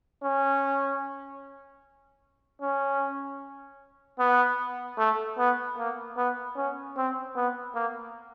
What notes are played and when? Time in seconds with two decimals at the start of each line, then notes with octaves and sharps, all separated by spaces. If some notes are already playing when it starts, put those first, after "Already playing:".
0.23 C#4
2.62 C#4
4.19 B3
4.98 A3
5.38 B3
5.78 A#3
6.17 B3
6.56 C#4
6.97 C4
7.36 B3
7.75 A#3